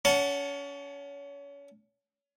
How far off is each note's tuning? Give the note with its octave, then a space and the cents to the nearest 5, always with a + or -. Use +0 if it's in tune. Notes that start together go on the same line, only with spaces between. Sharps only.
C#4 +30 F#5 +0 A5 +0